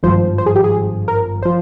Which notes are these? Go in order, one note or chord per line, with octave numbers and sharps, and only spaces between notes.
G#1 G2 F3 C5
C5
G#4
G4
G#4
A#4
F3 C5